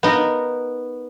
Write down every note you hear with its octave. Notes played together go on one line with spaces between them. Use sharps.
B3 D#4 A#4